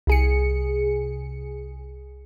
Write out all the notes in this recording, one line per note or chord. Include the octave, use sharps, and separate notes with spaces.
C2 G#4 C#7